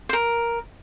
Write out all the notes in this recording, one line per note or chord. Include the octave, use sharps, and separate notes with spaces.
C5
A#4